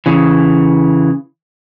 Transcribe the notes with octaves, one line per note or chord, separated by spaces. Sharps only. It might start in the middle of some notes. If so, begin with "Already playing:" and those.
C#3 E3